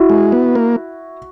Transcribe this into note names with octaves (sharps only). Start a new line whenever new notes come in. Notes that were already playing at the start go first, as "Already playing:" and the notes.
Already playing: E4 F#4
G#3
B3
A#3